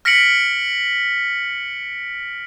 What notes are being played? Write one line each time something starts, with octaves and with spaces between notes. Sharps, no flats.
F6 A#6 B6 C#7 D7 F#7